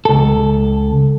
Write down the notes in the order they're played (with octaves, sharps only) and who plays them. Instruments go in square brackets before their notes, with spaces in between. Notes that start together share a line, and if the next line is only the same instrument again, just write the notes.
[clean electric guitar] C#2 A4